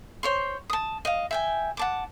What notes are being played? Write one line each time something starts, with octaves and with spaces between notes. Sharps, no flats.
C5 C#5 C6
A5 D#6
D#5 F5
E5 G5 G#5
F#5 A5 D6